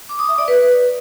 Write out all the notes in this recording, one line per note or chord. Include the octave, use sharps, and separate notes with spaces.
D6
D#6
E5
D5
B4